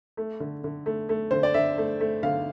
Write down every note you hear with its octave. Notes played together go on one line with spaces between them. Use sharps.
A3
D3
D3
A3
A3
D3 C5
D5
D3 E5
A3
A3
D3 F5